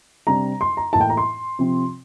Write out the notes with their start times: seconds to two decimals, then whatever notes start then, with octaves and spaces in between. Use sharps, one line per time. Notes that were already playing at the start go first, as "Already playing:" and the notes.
0.27 C3 G3 D4 A#5
0.61 C6
0.77 A#5
0.93 A2 E3 A#3 E4 A5
1.01 G5
1.10 A#5
1.17 C6
1.59 C3 F3 C4